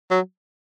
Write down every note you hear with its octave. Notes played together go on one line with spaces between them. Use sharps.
F#3